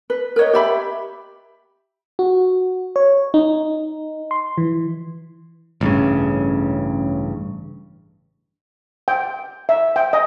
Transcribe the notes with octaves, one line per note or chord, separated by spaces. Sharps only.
B4
A#4 B4 C#5 D#5
G4 E5 B5
F#4
C#5
D#4
C6
E3
A1 G2 C#3
G5
E5
G5
D#5